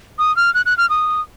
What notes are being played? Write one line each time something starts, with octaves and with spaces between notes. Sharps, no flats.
D#6
F6
F#6
F#6
F6
D#6